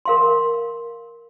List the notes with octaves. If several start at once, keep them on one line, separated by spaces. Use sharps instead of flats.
A#4 F5 C6